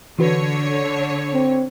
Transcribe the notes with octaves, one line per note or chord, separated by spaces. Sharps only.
D3 E3 F#4 B4 C#5
C4